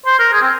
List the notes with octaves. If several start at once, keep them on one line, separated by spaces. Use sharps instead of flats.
C5
A#4
G#4
C4